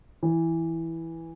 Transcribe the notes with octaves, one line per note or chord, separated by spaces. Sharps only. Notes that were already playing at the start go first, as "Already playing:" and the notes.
E3